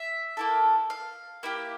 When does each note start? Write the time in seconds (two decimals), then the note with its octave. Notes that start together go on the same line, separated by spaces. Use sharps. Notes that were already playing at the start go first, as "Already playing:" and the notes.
Already playing: E5
0.37 A#3 E4 A4
0.90 F5
1.43 A#3 E4 G4